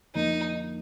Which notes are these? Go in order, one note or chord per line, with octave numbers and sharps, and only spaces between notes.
F2 D3 F3 A#3 D#4